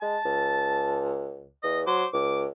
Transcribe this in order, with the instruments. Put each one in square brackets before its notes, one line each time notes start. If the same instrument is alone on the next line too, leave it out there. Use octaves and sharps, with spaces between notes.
[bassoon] G#3 [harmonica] A5
[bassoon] C#2
[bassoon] E2 [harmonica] D#5
[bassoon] F#3 [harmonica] C5 D6
[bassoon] C#2 [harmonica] D6